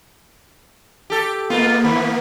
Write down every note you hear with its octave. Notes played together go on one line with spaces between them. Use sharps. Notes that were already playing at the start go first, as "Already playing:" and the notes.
G4 A4
G#3 A#3 B3 F4
D#3 E3